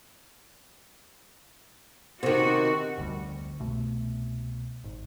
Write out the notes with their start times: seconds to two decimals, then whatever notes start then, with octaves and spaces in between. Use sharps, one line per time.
2.23 C3 D#3 F#4
2.98 F1 D2 G#2 G3
3.60 C2 B2 A3
4.84 G#1